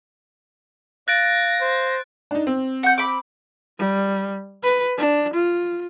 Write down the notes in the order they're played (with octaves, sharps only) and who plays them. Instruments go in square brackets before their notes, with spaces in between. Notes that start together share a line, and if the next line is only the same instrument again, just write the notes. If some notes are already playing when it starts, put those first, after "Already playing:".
[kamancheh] F5 [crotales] F#6 A6 D7 [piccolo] A#6
[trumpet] C5
[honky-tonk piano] D4 D#4
C4
[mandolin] F#5 G6
B5 D6
[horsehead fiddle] G3
B4
D4
F4